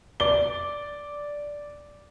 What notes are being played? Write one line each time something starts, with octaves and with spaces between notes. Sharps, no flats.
D5 G7